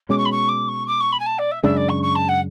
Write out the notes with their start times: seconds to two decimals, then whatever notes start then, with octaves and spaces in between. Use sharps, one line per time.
0.09 B2 G#3 C#4 D6
0.18 C#6
0.25 B5
0.32 C#6
0.48 D6
0.68 C#6
0.87 D6
1.00 C#6
1.12 B5
1.19 G#5
1.26 A5
1.38 D5
1.51 E5
1.63 F#2 C#3 G#3 D4 E5
1.76 D5
1.89 C#6
2.02 C#6
2.15 A5
2.28 F#5